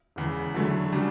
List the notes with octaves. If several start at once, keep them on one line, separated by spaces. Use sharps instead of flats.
E1 E2 C#3
E2 D3 F#3 A3
C#3 G3 D4 F#4